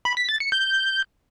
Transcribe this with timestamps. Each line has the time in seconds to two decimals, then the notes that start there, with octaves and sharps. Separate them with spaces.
0.05 B5
0.17 B6
0.29 A6
0.40 C#7
0.52 G6